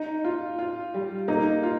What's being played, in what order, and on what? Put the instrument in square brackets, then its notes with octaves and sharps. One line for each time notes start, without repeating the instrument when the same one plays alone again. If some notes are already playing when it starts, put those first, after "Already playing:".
Already playing: [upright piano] D#4
[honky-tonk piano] F4
F4
G3
[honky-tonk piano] A#3 [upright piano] D#4
[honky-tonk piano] F4